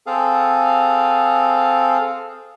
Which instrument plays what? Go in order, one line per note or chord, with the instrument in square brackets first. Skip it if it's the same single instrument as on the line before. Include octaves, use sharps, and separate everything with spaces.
[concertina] C4 G#4 A4 F5